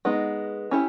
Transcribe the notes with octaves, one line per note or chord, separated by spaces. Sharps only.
G#3 B3 D#4
C#4 E4 G4